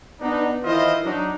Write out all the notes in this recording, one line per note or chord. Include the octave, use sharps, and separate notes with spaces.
B3 D4 D#4
D#3 E3 E4 F4 C5 D#5
F#3 D4 D#4